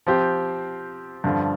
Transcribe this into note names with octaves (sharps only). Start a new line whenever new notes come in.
F3 C4 G4
G2 D3 F3